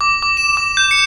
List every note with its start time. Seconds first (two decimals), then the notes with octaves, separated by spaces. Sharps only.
0.01 D6
0.23 D6
0.37 E7
0.57 D6
0.77 G6
0.91 C#7